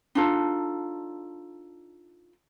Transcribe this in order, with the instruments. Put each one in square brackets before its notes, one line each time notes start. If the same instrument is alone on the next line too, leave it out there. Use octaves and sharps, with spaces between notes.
[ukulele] D4 D#4 F4 A4